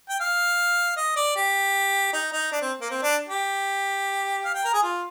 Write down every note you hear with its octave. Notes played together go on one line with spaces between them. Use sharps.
G5
F5
D#5
D5
G4
D#4
D#4
D4
C4
A#3
C4
D4
G4
F5
G5
A#4
G#4
F4